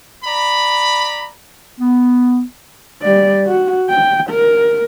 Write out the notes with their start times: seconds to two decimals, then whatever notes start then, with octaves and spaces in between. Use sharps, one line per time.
0.24 D5 A#5 B5
1.78 B3
3.02 G3 D5
3.46 F#4
3.90 G5
4.30 A#4